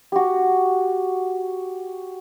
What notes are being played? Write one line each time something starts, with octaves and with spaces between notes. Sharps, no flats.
F#4 G4